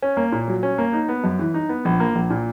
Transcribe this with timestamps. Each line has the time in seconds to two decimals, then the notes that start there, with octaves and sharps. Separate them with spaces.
0.02 C#4
0.17 A#3
0.32 A#2
0.48 F#3
0.63 C#4
0.78 A#3
0.93 D#4
1.09 B3
1.24 F#2
1.39 E3
1.54 D#4
1.69 B3
1.85 A#1
2.00 A#3
2.15 A#1
2.30 A#2